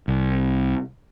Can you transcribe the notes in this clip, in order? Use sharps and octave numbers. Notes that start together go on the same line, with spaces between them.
C2